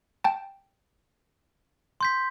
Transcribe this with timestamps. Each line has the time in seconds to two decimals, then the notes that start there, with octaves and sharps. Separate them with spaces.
0.24 G5 A5
2.01 C6 G6 B6